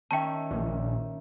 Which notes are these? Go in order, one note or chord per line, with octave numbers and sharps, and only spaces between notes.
D#3 C#4 E5 G5 A5
A#1